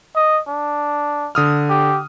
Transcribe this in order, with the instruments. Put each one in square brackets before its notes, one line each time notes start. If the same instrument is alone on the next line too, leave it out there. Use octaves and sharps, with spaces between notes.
[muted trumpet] D#5
D4
[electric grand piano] D3 D#6 F6
[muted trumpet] G4